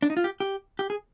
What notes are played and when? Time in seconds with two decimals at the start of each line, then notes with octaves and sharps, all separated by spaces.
0.02 D4
0.10 D#4
0.17 F4
0.24 G4
0.40 G4
0.79 G4
0.90 G#4